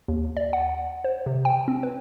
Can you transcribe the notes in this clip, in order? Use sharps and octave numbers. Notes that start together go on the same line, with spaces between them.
D#2
D5
F#5
C5
C3
G5
C4
B4